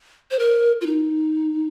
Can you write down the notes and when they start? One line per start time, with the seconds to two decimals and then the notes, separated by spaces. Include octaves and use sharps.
0.31 C5
0.39 A#4
0.81 F4
0.86 D#4